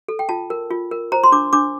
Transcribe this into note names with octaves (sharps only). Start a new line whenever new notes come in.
A4
G5
F4 A5
A#4
F4
A#4
C5 A#5
C6
D4 D6
D4 D6